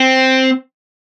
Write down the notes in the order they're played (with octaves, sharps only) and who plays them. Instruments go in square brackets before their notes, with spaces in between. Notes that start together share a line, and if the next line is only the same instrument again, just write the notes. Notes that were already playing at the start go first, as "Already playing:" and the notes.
Already playing: [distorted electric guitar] C4